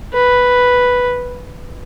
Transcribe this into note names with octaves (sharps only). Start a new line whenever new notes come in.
B4